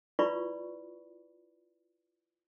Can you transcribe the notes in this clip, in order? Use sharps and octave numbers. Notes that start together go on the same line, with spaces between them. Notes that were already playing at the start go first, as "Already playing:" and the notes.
E4 F4 B4 D5 B5 C#6